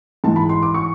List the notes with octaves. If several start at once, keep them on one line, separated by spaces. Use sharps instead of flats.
G#2 E3 A5
B5
C6
D6
C#6